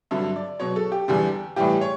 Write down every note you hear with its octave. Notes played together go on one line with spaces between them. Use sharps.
G2 D3 F#3 E5
D5
B2 F#3 C#5
A4
G4
E2 D3 G3
A2 E3 G3 G4
C#5